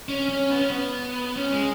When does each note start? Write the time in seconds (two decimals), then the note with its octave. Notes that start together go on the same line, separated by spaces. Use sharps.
0.09 C#4
0.29 C#4
0.50 B3
0.60 C#4
0.70 B3
1.36 C#4
1.52 G#3